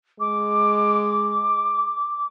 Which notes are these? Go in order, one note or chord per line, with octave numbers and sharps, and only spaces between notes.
G#3 D6